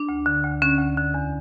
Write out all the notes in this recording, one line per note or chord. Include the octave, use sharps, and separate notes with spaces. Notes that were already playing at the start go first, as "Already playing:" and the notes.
Already playing: D4
D2
D3
D2
D3 C#4
D2
D3
E2